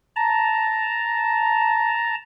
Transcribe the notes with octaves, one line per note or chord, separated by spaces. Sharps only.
A5 A#5